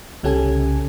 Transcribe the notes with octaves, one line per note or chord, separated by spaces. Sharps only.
C2 C#3 C#4 G4 A4 G#5